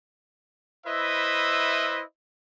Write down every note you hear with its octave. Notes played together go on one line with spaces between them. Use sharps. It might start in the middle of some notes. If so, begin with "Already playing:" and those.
E4 B4 C5 D#5 E5